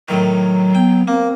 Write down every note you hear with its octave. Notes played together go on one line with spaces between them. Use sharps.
A2 D#3 F#3
B3 G5
A#3 C4